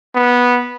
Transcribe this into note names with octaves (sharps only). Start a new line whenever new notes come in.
B3